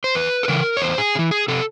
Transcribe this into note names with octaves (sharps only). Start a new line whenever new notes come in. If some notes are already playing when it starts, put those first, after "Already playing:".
C5
E2 B4
A4
C#3 E3 A#4
C#5
E2 C5
G#4
C#3
E3
G#4
C3 A4